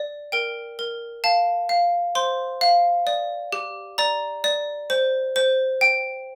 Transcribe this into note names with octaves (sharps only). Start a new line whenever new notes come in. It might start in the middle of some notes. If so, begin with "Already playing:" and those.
Already playing: D5
A#4 G5
A#4
F5 A5
F5
C5 C6
F5
D5
G4
D5 A#5
D5
C5
C5
G5